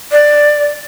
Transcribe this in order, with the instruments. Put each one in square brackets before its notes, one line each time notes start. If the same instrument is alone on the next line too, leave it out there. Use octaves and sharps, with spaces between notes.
[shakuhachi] D5